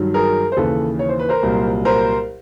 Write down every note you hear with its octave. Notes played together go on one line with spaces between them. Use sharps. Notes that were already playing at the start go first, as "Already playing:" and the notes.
Already playing: G2 D#3 F#3
G#4 A#4
C5
D#2 C#3 E3 A4 B4
C#5
C5
B4
A#4 C5
C2 A#2 F#3
A#4 C5